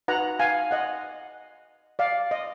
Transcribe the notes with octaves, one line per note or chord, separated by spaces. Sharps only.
D#4 F#4 B4 F#5 A#5
F5 G#5
D#5 F#5
D5 F5
D#5